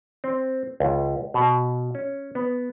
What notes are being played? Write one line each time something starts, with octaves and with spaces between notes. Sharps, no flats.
C4
C#2
B2
C#4
B3